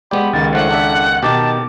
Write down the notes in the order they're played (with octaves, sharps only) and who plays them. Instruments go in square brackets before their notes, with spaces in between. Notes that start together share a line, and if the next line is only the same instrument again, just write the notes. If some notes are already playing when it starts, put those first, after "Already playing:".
[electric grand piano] G#3 D5 [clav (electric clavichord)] B3 G4 [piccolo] B5
[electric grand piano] C#2 D#3 [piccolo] A6
[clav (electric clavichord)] F3 A3 D4 [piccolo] F#5
[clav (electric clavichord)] D4 A4 E5
[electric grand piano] B2 D6 [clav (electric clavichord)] D#3 G4 [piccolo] A5